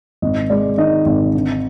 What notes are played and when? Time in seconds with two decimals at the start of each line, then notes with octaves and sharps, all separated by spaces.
0.22 G#1 D#5
0.50 G#3 D5
0.78 D#3 D#5
1.06 G#1
1.34 D3